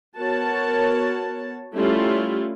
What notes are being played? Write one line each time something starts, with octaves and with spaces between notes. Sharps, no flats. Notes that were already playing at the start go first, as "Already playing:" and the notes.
B3 F#4 A#4 C#5 A5
G3 A3 C#4 E4 F4